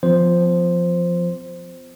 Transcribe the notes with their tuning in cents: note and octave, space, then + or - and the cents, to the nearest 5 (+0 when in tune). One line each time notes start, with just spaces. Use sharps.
F3 +0 B3 +45 C5 +0